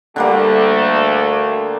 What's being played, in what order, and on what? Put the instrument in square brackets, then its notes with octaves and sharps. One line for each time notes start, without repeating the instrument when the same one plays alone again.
[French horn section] D2 A3 [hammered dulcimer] D3 G3 A#3